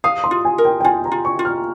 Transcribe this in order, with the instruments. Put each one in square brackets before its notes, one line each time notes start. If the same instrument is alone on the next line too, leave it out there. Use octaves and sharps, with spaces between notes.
[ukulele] F5 [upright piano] D#6
[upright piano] C6
[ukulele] F4
[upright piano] G#5
[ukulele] A#4
[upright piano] G5
G5
[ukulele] F4 [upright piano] G#5
[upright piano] A#5
[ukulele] F4
[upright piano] C#6
[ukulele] F4
[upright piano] F6